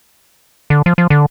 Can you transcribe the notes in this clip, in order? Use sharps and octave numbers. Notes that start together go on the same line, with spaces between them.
D3
F3
F3
D3